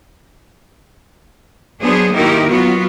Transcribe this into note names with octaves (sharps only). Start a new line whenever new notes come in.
F#3 B3 D4 G#4 C5
D#3 A#3 D#4 E4 G4 A#4
F#3 B3 F4 F#4